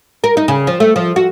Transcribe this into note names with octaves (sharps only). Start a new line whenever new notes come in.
A#4
D#4
C#3
F3
A3
F3
F#4